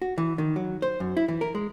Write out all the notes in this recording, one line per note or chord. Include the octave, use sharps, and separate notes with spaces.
F#4
E3
D#3
F#3
C5
F#2
E4
E3
A#4
G#3